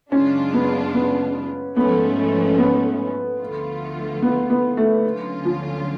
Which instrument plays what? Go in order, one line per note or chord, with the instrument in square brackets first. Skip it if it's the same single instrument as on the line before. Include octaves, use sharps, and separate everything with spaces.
[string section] F#2 C#3 G#3 D4 F4 [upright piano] C#4
[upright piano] B3
B3
[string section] G#2 F3 A3 C#4 [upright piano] B3
[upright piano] B3
[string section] D2 D3 F3 A3 F4
[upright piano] B3
B3
A3
[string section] D2 D3 F#3 C#4 F4
[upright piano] F3